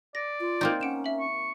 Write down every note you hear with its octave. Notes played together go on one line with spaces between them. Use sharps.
D5 A#6
F4
A#3 C4 D#4
C#4 F#5 D7 E7
E5 F#7
C#6